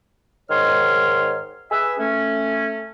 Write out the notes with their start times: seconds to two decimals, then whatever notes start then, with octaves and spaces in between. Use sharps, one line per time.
0.50 G#2 D#3 C#5 C6 F6
1.72 G#4 B4 E5
1.99 A3 C#4